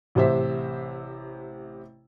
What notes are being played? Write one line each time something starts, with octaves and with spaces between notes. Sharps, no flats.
A1 C3 C5 E5